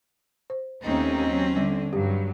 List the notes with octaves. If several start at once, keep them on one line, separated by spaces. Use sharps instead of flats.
C5
D#2 A3 C4 C#4 D#4
F#3
D3 G3
G2 F#3 G4